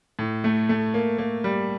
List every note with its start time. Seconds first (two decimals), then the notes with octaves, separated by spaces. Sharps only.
0.19 A2
0.44 A3
0.69 A3
0.94 A#3
1.18 A#3
1.44 G3